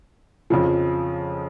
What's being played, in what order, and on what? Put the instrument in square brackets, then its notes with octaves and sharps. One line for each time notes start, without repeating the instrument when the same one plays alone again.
[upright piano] F2 C#3 F3